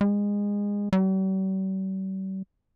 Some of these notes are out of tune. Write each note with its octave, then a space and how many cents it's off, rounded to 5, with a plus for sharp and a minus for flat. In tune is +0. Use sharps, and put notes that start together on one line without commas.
G#3 -25
G3 -45